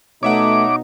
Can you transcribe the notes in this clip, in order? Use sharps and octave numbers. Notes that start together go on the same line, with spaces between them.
B2 A3 D#4 C#5 E5 F#5 D6